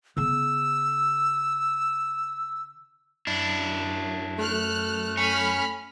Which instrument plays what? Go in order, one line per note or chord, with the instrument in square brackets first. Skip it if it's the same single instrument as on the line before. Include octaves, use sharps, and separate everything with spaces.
[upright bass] C#3 B3 [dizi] E6
[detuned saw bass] F#2 [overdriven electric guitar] D4 E4
[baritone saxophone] A3 [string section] F6 F#6
[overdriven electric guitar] C#4 [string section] B5 F6